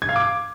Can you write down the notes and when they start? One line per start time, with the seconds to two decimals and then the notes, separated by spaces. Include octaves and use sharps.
0.02 G#6
0.09 F5
0.16 D6